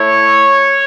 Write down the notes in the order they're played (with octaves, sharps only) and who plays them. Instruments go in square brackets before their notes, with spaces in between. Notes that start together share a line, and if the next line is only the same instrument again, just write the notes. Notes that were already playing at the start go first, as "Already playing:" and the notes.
Already playing: [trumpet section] A3 E4 C#5